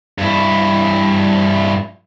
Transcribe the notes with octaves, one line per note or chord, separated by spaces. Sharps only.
G2 E4